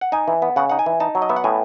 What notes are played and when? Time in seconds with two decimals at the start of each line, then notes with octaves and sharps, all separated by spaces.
0.01 F#5
0.12 D#4 G#5
0.28 E3
0.42 B3
0.56 C#3 F#5
0.70 D#4 F#5
0.79 G#5
0.86 E3
1.00 D#4 A5
1.15 F#3
1.22 D#5
1.29 B3 E5
1.36 F#5
1.44 A2 G#5